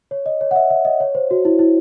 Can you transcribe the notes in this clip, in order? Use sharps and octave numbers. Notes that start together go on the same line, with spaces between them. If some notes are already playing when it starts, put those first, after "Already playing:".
C#5
D#5
C#5
F#5
E5
E5
D#5
C#5
C5
F#4
E4
E4